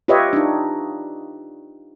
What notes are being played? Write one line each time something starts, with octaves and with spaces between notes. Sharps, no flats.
F4 G4 B4 C#5 D#5 E5
D4 D#4